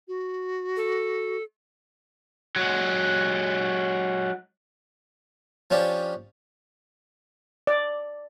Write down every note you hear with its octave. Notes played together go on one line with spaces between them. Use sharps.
F#4
A4
F#3 G#3
F3 C#4 D4 G4
D5